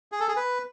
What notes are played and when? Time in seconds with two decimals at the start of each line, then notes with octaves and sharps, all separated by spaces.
0.12 G#4
0.20 A4
0.28 G#4
0.36 B4